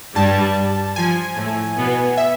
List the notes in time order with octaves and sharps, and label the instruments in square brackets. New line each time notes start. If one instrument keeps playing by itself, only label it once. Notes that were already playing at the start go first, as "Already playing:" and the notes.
[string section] G2 G3 [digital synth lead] A5
[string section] F3 [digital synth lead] G#5
[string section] A2 A3
B2 B3
[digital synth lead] E5